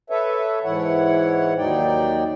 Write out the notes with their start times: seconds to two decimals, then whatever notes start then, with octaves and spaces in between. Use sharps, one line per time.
0.10 A4 B4 C#5 E5
0.64 G#2 E3 E4 C#5 F#5
1.58 D#2 F#3 D#4 D5 G5